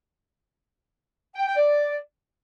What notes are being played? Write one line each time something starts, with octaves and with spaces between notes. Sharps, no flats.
G5
G5
D5